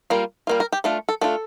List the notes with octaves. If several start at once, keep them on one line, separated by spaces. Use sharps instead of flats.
G3 A#3 F4
G3 A#3 F4
A#4
G4
A3 D4 F4 A4
A4
A3 D4 F4 A4